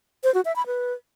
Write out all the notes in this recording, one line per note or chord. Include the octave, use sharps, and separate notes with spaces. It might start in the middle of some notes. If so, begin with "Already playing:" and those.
C5
F#4
E5
B5
B4